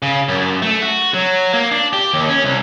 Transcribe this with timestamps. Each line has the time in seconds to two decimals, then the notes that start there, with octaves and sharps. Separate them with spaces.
0.02 C#3
0.28 F#2
0.62 A3
0.82 F#4
1.14 F#3
1.53 A#3
1.71 D4
1.93 G4
2.13 D#2
2.29 C#4
2.44 C2